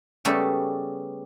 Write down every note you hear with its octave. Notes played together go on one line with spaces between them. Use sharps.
C#3 G3 A3 B3 G4 A4